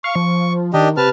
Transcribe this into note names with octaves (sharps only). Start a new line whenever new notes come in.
F5 C#6
F3
D#3 D4 G4 D#5
C3 B4 A5 F6